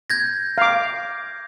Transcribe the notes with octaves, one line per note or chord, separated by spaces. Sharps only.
G6 G#6 A#6
F5 D6